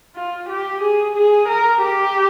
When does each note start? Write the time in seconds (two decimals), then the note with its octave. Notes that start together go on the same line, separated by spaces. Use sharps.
0.16 F4
0.49 G4
0.81 G#4
1.16 G#4
1.48 A#4
1.82 G4